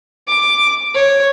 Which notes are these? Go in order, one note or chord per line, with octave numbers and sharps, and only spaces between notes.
D6
C#5